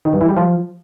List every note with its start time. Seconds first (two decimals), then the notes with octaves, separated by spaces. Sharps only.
0.05 D#3
0.13 G2
0.21 E3
0.29 G3
0.37 F3